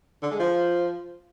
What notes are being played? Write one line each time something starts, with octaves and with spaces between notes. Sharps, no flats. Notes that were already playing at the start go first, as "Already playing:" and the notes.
D3
G#3
F3